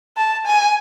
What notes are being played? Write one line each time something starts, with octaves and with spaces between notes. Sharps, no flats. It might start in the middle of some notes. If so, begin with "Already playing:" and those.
A5
G#5